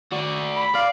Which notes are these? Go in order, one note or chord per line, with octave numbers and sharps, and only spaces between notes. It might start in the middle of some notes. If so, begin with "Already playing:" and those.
F#4 D5
B5
D5 F5